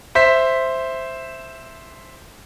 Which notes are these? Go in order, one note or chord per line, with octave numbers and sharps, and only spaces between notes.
C5 E5 B6